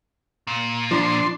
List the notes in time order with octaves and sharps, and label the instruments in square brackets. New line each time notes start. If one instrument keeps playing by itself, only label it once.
[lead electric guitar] A#2
[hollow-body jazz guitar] F3 [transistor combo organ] D4 C6